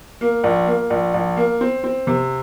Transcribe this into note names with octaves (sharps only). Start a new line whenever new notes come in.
A#3
A#1
A#3
A#1
A#1
A#3
C4
C4
C3